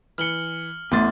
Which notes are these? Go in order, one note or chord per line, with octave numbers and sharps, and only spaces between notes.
E3 F6 C#7 F#7 G7
A1 E2 A3 C6 A6